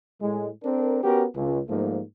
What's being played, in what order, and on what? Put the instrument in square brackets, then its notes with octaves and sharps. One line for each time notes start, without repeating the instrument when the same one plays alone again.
[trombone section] A2 G#3
C4 D4 A4 A#4
B3 C#4 F#4 G4 A#4
C#2
G#2 F3 G3 A3 A#3